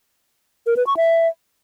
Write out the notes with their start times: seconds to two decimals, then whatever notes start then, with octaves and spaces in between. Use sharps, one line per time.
0.67 A#4
0.77 B4
0.87 C#6
0.97 E5